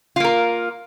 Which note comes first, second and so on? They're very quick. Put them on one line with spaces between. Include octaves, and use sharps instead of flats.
F4 A#3 A#4